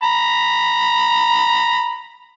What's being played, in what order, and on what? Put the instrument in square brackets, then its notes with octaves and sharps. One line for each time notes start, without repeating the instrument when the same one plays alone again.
[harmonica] A#5 B5